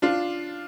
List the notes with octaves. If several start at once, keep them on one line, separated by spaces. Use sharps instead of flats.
D4 F4